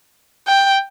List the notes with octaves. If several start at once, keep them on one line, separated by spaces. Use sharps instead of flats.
G5